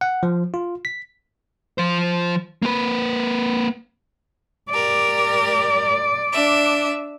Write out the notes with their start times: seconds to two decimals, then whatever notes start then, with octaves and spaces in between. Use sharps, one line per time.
0.01 F#5
0.23 F3
0.54 F4
0.85 B6
1.78 F3 C5
2.62 A#3 B4
4.70 G4 A#4 D5
6.32 D4 E5